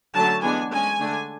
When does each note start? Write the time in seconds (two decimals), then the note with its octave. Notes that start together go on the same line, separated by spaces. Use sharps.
0.14 D3 F#3 A3 C#4 A5
0.42 E3 G#3 B3 D4 G#5
0.70 G#3 C#4 G#5
0.99 D3 A3 D4